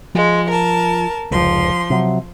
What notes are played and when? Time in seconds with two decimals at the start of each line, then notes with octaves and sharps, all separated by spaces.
0.15 F3 G#3
0.49 A#4 A5
1.31 F1 C#2 F3 C6
1.90 C3 F#3